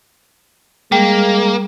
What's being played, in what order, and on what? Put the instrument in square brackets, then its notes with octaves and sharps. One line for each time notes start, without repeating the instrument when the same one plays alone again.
[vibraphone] G3 [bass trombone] G#3 [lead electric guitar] A#3 [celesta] G5